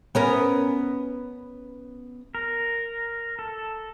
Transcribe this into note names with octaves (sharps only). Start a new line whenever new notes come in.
B3 C#4 A#4
A#4
A4